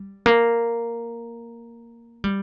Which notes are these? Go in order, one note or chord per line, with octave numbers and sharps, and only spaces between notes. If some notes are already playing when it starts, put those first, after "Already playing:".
Already playing: G3
A#3
G3